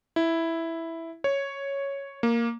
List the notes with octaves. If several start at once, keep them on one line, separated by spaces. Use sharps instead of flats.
E4
C#5
A#3